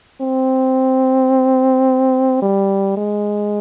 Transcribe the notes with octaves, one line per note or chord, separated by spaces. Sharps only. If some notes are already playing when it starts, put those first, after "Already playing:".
C4
G3
G#3